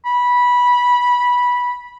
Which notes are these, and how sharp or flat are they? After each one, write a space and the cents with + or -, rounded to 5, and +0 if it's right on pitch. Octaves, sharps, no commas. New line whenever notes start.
B5 -15